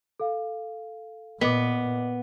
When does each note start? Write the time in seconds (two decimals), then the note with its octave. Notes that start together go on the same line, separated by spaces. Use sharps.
0.20 A4 F5
1.41 A#2 B3 D#5 D6